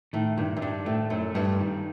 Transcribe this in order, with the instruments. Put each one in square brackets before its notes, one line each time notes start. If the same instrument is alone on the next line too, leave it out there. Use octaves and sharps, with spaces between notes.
[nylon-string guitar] A2 [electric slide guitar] D#3
[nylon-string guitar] G2 [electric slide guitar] D#3
[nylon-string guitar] F#2
[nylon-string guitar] G2 [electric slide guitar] D4
[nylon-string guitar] A2 [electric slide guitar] A3
[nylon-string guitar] F#2 [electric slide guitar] A3
[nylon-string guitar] G2 [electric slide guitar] G3
[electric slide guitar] D#3